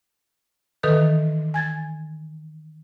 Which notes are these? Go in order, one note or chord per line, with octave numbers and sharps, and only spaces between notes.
D#3 E3 A4 B4 D#6 G6
G#5 G#6 A6